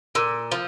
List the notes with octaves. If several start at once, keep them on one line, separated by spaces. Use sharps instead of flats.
A#2 E6
F3